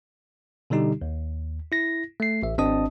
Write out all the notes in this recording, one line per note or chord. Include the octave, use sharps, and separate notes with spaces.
B2 D3 G3 D#4 G4
D#2
E4 A#6
A3 C7
A1 E5
G#1 C4 D4 D#5 A5 D#6